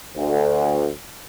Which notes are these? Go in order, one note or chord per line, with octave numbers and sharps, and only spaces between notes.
D2